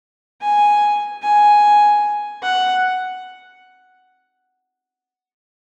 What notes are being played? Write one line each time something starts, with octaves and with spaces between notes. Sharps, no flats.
G#5
G#5
F#5